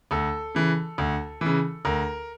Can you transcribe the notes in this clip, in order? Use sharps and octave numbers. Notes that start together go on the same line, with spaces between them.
D2 A4
C#3 E3
D2
C#3 E3
D2 A#4